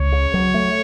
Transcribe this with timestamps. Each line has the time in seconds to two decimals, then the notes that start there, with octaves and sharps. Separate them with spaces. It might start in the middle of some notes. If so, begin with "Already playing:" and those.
Already playing: C#2 C#5
0.12 C#3
0.34 F#3
0.54 A3